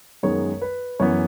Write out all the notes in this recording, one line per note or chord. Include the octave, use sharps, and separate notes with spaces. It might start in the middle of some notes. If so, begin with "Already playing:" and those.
F#2 D#3 G#3 B3 C#5
B4
F#2 E3 B3 C#5